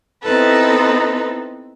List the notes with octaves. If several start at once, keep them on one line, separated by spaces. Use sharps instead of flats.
B3 C4 D#4 E4 A4 B4